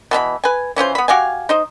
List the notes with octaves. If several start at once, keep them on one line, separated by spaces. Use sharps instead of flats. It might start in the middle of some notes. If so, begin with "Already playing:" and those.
B2 E3 E4 B5
B4 G#5
E3 C#4 F4 C5
B3 B5
F#4 G4 F5 G#5
D#4 C5 D#5